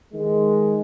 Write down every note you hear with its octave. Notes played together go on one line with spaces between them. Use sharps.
D#3 G#3